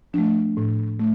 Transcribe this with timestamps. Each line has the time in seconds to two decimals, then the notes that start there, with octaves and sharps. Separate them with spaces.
0.14 F3 A3 D4
0.57 A2
1.00 A3